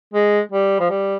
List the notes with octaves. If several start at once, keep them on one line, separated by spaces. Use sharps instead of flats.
G#3
G3
F3
G3